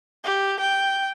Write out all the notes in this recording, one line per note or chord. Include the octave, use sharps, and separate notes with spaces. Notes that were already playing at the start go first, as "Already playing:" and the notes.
G4
G5